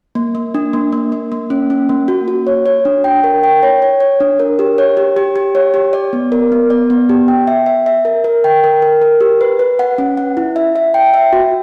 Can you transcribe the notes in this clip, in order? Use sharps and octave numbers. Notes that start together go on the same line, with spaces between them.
A#3
A#3
D4
A#3
A#3
A#3
A#3
C#4
C#4
A#3
F#4
F#4
C#5
C#5
D4
G5
A#4
G5
C#5
C#5
C#5
D4
A#4
G4
C#5
G4
G4
G4
C#5
G4
D5
B3
A#4
B3
D5
B3
G4
G5
E5
E5
E5
A#4
A#4
G5
A#4
A#4
A#4
G4
B4
B4
F#5
C#4
F#5
E4
E5
E5
G5
E5
F#4